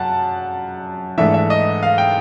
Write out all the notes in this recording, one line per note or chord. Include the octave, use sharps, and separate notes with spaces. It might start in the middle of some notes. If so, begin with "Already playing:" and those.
Already playing: F#2 F#5 A5
G#2 E3 A3 D4 E5
E5
D#5
F5
G5